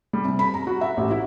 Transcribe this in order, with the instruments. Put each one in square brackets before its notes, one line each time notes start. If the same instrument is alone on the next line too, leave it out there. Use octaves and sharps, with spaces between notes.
[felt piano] G3
C3
B5
A#5
F#4
E5
A1
E4